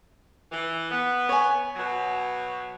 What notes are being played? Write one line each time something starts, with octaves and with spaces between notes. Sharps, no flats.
E3
B3
C#5 G#5
B2 F#3